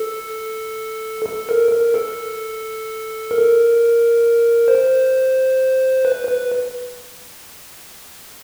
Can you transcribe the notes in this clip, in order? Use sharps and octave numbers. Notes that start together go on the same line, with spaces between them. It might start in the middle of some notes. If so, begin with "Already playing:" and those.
Already playing: A4
A4
A#4
A#4
A4
A#4
C5
B4
B4